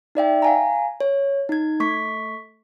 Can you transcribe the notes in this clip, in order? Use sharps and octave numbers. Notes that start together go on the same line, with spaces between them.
D#4 D5 E5 G5
F5 G#5 A#5
C#5
D#4 G#6
A3 C#6 B6